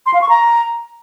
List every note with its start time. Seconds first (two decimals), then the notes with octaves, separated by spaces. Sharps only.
0.06 C6
0.14 F5
0.21 C#6
0.29 A#5